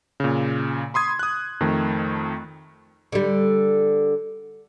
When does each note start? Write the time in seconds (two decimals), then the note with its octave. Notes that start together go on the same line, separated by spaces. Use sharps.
0.20 A#2 C#3
0.94 B5 C6 D#6 G#6
1.19 D#6 F#6
1.60 F2 D#3 A3
3.12 D3 G3